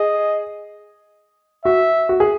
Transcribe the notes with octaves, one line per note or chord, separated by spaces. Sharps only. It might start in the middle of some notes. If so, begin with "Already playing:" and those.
Already playing: G#4 D#5
F#4 E5
F#4
G#4